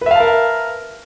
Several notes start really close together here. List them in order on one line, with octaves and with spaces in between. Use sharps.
B4 E5 F5 A5 A#4